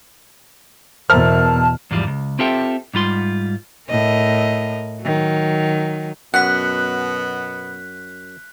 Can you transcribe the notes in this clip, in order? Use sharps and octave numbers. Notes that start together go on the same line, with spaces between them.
E2 B2 A#4 C5 E5 A5 F6
E2 G#2 F3 G3
C#2
C4 F4 G4 A4 E5 G5
G#2 G3 F4 C6
A2 A#4 D#5
D#3 F#3
F#2 B2 B3 F#5 F#6 B6